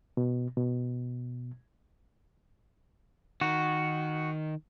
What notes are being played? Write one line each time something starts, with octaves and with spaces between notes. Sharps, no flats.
B2
B2
D#3 F#4